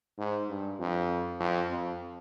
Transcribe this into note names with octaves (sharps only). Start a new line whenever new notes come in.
G#2
G2
F2
F2
F2